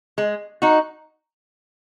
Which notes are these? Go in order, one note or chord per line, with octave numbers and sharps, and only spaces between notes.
G#3
D#4 F#4